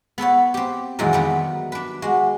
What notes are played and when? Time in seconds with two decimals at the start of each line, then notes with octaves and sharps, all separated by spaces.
0.18 B3 A4 B4 C#5
0.54 C4 G4
0.99 F2 A#2 D#3 E3 F#3 G#3
1.13 D#3 F#3 G3 B3
1.72 D4 B4
2.02 G#3 F#4